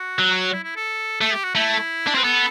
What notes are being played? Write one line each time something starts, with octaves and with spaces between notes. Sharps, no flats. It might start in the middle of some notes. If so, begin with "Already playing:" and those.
Already playing: F#4
F#3
E4
E4
A4
A3 A4
G4
F#4
A3 E4
D4
C4 B4
B3 A4